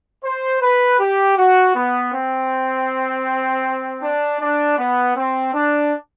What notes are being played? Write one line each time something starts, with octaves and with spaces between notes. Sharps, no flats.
C5
B4
G4
F#4
B3
C4
D4
D4
B3
C4
D4